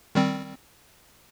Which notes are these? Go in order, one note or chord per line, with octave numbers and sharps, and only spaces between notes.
D#3 G3 C4